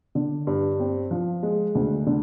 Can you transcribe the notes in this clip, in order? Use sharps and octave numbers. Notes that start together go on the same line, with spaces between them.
D3
G2
C4
F3
G#3
D2
D3